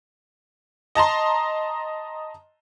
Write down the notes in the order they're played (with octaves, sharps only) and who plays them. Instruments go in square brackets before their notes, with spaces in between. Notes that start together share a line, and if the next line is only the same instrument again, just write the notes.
[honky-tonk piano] D#5 A5 A#5 C6